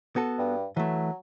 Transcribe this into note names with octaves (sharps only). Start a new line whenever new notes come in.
B3 F#4 A4
G2
E3 F#3 A3